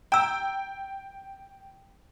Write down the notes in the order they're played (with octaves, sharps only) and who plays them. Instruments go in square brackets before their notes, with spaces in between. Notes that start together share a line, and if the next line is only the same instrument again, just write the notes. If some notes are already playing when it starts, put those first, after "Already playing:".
[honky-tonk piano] G5 [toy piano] A#5 E6